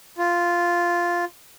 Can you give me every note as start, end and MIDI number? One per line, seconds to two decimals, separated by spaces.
0.18 1.25 65